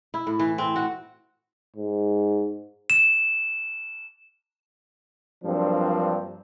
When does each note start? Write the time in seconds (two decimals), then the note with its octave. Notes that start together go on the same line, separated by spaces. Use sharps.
0.14 E4
0.27 A2
0.39 E3
0.58 C4
0.76 F#4
1.76 G#2
2.90 E7
5.44 G2 F3 F#3 A#3 C4 D4